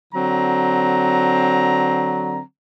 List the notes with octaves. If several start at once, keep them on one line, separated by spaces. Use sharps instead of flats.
D3 F#3 C4 A#5